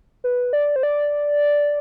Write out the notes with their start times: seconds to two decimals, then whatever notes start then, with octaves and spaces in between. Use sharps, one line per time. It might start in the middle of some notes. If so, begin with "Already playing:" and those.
0.24 B4
0.53 D5
0.76 C5
0.83 D5